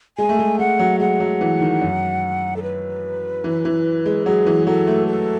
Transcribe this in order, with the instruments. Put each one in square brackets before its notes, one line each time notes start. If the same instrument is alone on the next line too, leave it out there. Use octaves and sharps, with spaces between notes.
[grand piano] G#3 [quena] G#5
[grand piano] A3
G#3
[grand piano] G#3 [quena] F#5
[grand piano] F#3
[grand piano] G#3 [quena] F#5
[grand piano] F#3
E3
D#3
F#2
[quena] A4
B4
[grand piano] E3
E3
G#3
[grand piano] F#3 [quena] G#4
[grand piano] E3
[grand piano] F#3 [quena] A4
[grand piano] A3
[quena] A4